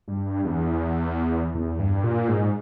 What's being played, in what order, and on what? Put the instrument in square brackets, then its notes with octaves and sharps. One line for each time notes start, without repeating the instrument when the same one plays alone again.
[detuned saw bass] G2
E2
E2
G2
A#2
G#2